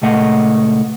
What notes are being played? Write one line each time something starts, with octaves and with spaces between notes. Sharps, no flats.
C#2 A#2 A3 D#5 F#5